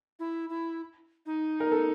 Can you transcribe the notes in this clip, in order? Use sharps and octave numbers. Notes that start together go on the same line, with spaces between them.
E4
E4
D#4
A#4
A4